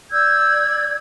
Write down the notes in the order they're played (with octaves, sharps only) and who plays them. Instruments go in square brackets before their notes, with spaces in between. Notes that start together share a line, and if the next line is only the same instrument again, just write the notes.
[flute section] D5 E6 G6 G#6